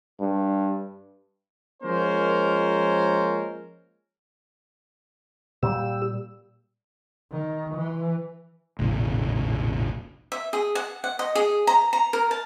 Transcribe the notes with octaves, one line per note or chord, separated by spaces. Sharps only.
G2
F3 G#3 A#3 C#4 A#4 C5
A#2 G3 G4 E6
D#3
E3
E1 A1 A#2 C#3
E5
G#4
F#5
F#5
D#5
G#4
A#5
A#5
A#4
A5